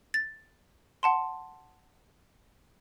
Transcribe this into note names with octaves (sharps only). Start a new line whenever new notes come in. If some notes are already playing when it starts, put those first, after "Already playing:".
A6
F#5 A5 C6